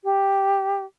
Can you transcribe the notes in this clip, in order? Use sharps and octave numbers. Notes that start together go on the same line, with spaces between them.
G4